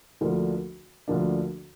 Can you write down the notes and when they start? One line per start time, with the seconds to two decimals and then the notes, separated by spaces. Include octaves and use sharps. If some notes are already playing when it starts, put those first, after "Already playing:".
0.21 D2 D3 F3 A#3 D4
1.08 D2 D3 F3 A#3 D4